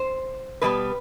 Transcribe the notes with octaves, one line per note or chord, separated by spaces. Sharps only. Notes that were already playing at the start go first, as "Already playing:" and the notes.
Already playing: C5
B2 G3 B3 B4